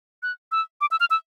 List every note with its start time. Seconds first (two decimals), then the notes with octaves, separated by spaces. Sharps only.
0.23 F#6
0.52 E6
0.81 D6
0.91 E6
1.00 F6
1.10 E6